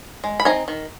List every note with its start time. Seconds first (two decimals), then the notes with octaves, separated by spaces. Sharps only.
0.24 G#3
0.40 B5
0.45 C4 D#4 G#5 A#5
0.68 D#3